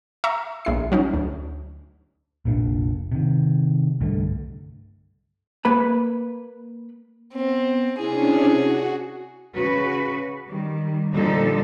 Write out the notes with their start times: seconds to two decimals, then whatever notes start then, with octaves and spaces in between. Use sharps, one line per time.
0.24 E5 A#5 C#6
0.65 A#1 E4 C7
0.92 F#3 C#4 D#4
1.14 D2
2.45 F1 A#1 A#2 D4
3.12 C3 D#3
4.01 C2 G2 D3 A3
5.65 A#3 B4 B5
7.34 B3 C4
7.99 C3 C#4 D4 E4 G#4
8.47 F#4
9.54 C#3 F#4 B4
10.47 D#3 G3
11.12 A#2 D3 F3 G3 D#4 A4